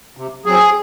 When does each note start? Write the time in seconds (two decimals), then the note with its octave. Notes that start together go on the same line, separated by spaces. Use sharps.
0.17 C3
0.46 F#3 C4 G#4